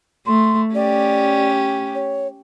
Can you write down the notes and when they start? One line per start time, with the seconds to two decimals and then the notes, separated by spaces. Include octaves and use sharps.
0.27 A3 C6
0.75 C#4 G4 D5
1.95 C#5